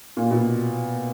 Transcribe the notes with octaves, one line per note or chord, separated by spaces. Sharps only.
A#2
B2